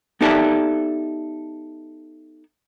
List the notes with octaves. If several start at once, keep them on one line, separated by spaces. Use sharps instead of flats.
B3 D#4 G4 A4 D5 E5